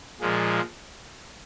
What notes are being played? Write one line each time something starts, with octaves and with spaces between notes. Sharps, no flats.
A#2 F3 G#3